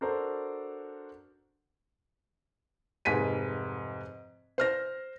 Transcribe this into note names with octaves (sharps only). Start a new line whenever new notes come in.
D4 F#4 A4 A#4 C5
F1 G#2 G#5 B6 D#7
C5 F6 A#6